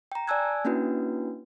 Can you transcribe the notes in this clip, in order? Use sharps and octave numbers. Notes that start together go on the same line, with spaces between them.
G5 A#5
D5 G#5 A5 E6 F#6 G#6
A#3 C#4 D4 E4 F#4 B4